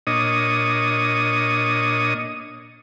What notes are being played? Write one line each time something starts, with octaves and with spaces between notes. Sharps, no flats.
A#2 D4 C#5 D#5 D#6